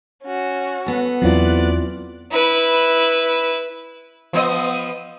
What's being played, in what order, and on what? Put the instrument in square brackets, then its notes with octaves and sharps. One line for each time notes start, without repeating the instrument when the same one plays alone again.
[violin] C#4 F#4
[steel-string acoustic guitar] B3 A4
[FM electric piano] E2 F#3 [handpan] C4 E4 F4 [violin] D5 F#6
[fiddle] E4 B4
[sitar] F3 B3 D#5